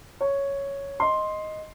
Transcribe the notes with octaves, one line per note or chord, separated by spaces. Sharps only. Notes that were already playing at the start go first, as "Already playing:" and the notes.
C#5
D#5 C6